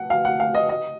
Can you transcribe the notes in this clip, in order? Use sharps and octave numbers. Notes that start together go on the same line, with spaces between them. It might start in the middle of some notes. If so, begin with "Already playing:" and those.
Already playing: F#5
F5
F#5
F5
D#5
D#5